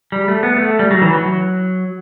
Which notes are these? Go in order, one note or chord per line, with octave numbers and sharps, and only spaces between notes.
G3
A3
B3
A3
G3
F#3
E3
F#3